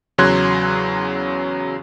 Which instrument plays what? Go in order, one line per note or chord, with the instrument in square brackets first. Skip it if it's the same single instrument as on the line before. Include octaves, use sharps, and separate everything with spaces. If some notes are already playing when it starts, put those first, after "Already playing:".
[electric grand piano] E2 C#3 F#3 C6 F#6 G#6